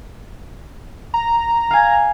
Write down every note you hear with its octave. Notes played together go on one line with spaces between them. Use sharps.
A#5
F5 G#5